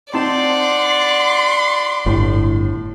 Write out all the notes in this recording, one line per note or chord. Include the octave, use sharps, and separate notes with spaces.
C4 D#4 D5 F#5 A5 C6
G1 A2